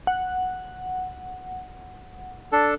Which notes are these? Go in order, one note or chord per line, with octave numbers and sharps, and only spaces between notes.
F#5
D4 A4